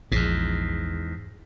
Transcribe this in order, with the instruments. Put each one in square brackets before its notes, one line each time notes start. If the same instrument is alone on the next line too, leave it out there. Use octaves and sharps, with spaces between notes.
[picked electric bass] A#1 F3 [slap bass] E2 G#2